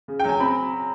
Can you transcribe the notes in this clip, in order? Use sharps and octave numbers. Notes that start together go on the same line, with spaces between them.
C#3
G5
F#3 G#5
C4 B5